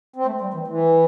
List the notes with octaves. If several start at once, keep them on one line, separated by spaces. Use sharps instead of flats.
C4
A3
G3
E3
E3